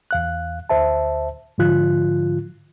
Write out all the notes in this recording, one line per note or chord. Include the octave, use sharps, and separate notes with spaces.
E2 F5 F#6
D2 C5 E5 A5
G#2 D3 F3 F4 F#6